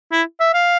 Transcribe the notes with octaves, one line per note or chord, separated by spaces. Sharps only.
E4
E5
F5